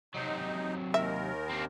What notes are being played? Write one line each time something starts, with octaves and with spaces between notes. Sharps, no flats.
C3 F#3 D#4
D#2 D#3 A#4 E5
C4 D4